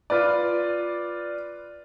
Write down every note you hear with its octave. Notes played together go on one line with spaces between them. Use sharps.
F4 B4 D5